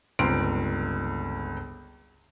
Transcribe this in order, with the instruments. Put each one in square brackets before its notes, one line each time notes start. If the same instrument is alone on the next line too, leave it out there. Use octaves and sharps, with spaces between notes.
[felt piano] G1 C#2 C4 A#5 C6 D7